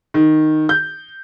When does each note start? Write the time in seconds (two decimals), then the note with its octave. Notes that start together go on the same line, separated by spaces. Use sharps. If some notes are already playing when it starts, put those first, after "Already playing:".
0.14 D#3
0.69 G6